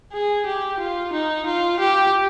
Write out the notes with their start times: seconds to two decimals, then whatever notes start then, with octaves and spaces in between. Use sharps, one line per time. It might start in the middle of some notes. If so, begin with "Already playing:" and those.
0.13 G#4
0.46 G4
0.80 F4
1.13 D#4
1.47 F4
1.80 G4